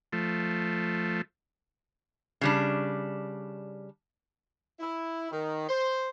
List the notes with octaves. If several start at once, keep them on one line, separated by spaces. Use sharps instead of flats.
F3 A3
C#3 G3 D4
E4
D#3
C5